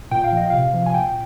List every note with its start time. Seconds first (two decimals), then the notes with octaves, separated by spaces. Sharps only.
0.11 A#2 G5
0.24 F5
0.32 F3 D#5
0.50 C3 F5
0.74 F3
0.86 G#5
0.94 A#2 G5